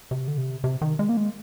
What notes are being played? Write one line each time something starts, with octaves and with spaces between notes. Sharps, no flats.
C3
D3
C3
C3
D#3
G#3
A#3
G#3